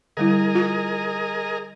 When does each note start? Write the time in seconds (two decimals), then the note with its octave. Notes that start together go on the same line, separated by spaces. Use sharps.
0.17 D3 G3 E4 G#4 A#4 D#5
0.55 F4